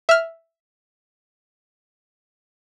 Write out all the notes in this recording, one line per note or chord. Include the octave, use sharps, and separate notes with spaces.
E5 F6